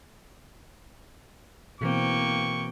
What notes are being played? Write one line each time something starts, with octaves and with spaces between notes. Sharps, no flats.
B2 E3 A#3 C4 G5 C#6